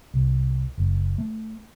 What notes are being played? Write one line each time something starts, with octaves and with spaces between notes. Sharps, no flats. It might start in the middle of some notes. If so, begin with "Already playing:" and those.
C2
F#1
A3